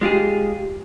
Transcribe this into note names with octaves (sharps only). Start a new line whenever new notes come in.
G#3 F4 G4 G#4